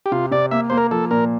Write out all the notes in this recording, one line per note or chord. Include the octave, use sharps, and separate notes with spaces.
G4
C3 F4
C3 D5
A#3 E5
A#3 C5
A#4
F3 A4
A#2 A#4